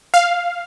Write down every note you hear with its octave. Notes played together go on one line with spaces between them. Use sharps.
F5